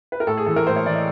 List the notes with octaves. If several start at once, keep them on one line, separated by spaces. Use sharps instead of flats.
B4
A#4
A2 A4
G#4
E3 A4
A#4
A2 C5
C#5
E3 D5
D#5